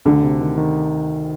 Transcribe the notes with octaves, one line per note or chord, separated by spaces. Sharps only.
D2 D3
C3
D#3
D#3